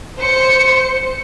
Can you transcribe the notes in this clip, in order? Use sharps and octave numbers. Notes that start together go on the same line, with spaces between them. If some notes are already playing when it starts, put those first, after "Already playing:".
C5 C#7